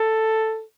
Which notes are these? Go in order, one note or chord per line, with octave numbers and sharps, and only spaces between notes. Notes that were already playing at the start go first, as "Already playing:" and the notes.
Already playing: A4